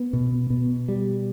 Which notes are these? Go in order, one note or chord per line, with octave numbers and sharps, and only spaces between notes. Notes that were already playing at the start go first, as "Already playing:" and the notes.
Already playing: B3
B2
B2
G3